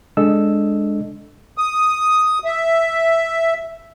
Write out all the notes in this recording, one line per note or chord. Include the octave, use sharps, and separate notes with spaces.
G#3 D4 A4 D#5 E6
D#6
E5